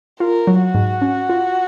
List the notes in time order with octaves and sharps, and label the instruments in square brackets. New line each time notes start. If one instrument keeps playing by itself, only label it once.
[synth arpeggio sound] F4 [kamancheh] A#4
[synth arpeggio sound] F#3
[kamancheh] F#4
[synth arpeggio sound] G#2
C#4
F4